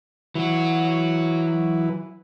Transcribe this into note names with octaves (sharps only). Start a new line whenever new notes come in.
E3 F#3 F#4